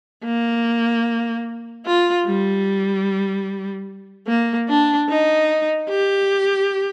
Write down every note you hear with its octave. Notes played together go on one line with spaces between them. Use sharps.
A#3
F4
G3
A#3
D4
D#4
G4